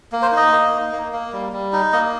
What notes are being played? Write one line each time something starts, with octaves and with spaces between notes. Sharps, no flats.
A#3
C5
D#4 D#5
A#3
D#4
A#3
A#3
G3
G3
D#4
A#3 D#5